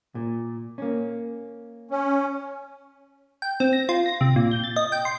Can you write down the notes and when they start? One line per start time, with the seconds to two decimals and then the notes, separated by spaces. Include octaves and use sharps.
0.15 A#2
0.78 A#3 C#4
1.91 C#4
3.42 G5
3.60 C4
3.73 A#6
3.89 F4
4.06 A#6
4.21 C3
4.36 A#2
4.51 G6
4.64 A6
4.76 D#5
4.92 G5
5.05 C6